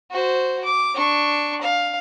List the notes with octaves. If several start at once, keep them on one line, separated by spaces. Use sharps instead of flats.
F#4 C5
D6
D4 C#6
F5